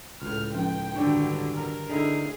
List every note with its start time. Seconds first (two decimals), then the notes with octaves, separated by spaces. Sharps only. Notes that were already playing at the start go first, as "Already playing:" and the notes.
0.22 C#2 A2 F6
0.54 F3 C#4 G5
0.96 G2 D3 D#3 F#3 D4
1.53 A#4
1.90 D3 A3 D#4 E4 G#4